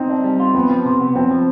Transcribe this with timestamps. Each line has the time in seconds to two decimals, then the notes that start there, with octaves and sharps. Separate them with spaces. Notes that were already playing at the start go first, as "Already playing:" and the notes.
Already playing: C4 D#4
0.09 D4
0.24 G3
0.40 F4
0.55 F2 B3
0.70 F3
0.85 C3
1.00 B3
1.16 F2 C4
1.31 F3